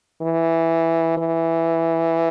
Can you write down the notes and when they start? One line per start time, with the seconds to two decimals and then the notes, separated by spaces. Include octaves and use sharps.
0.22 E3
1.17 E3